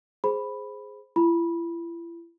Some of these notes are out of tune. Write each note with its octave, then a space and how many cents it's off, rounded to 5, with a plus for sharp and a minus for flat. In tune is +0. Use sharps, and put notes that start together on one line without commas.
G#4 +0 C5 +0 B5 +0
E4 +40 B5 -20